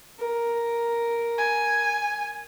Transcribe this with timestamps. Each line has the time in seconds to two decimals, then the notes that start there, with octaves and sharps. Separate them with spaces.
0.19 A#4
1.38 G#5